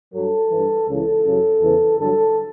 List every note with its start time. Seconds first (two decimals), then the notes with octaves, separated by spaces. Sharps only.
0.14 G2 F#3 A4
0.51 G2 E3
0.88 C#2 C#3 E3 A4
1.25 F#2 C#3 F#3
1.62 E2 C#3 E3
1.98 G2 D3 F#3 A4